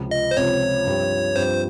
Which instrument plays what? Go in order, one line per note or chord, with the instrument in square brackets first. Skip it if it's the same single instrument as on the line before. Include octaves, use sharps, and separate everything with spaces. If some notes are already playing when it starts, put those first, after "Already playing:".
Already playing: [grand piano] C#2 C3 F3 C4
[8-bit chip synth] D#5
C5
[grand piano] C#2 C3 F3 C4 [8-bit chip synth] C#5
[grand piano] G2 F3 C4 G4
[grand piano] G2 F3 C4 G4 [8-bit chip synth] C5